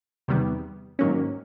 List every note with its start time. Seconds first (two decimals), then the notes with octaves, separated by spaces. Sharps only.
0.28 E2 C3 D#3 G3 B3
0.99 G#2 D#3 F#3 A#3 C#4